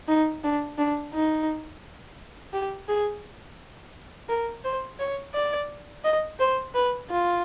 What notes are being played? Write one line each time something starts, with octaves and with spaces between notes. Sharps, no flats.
D#4
D4
D4
D#4
G4
G#4
A#4
C5
C#5
D5
D#5
C5
B4
F4